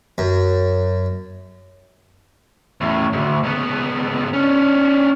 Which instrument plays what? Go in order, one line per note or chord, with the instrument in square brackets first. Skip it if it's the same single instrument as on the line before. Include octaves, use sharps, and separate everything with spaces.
[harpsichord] F#2
[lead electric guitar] E2 A2
D2 G#2
C#2 B3
C#4 D4